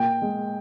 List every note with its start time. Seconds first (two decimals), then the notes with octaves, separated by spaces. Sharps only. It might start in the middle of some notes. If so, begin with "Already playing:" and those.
Already playing: A#2 G5
0.22 G#3